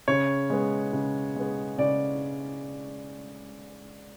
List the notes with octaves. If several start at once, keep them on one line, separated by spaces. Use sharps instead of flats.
C#3 C#5
G#3 B3
C#3
G#3 B3
C#3 D5